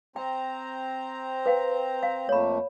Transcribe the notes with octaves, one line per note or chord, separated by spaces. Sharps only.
C4 C5 G5 A#5
B4 F5 G5
F5
F2 A3 A#3 C#5 B5